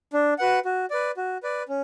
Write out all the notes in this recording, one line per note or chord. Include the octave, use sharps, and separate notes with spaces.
D4
F#4 B4 F#5
F#4
B4 D5
F#4
B4 D5
C#4